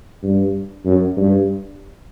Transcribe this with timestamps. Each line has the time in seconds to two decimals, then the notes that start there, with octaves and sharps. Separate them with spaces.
0.23 G2
0.85 F#2
1.17 G2